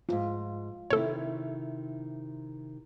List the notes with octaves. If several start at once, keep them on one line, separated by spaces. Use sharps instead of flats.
E2 G#2 F4
C3 D#3 E4 A4 C#5